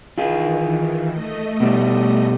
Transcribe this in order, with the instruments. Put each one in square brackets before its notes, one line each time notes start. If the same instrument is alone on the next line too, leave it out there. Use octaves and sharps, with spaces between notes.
[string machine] D#3 E3 [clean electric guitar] F4 G#4
[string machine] A3 D#5
[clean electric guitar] B2 G3